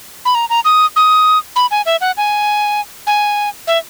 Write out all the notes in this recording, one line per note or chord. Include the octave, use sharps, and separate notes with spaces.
B5
A#5
A#5
D#6
D#6
B5
G#5
E5
F#5
G#5
G#5
E5